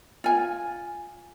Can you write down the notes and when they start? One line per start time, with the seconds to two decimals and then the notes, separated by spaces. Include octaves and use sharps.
0.24 F4 G#5